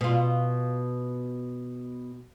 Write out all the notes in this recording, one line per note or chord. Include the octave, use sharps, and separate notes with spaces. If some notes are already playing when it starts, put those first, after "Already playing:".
B2 F4